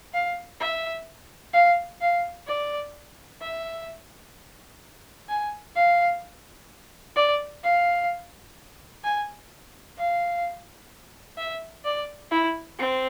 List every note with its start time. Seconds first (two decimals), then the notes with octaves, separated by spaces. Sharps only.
0.14 F5
0.60 E5
1.53 F5
2.01 F5
2.47 D5
3.42 E5
5.29 G#5
5.76 F5
7.16 D5
7.63 F5
9.04 G#5
9.97 F5
11.38 E5
11.85 D5
12.31 E4
12.79 C4